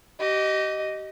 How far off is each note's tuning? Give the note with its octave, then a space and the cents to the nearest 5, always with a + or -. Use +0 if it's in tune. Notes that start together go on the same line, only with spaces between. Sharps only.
G4 -30 D#5 +0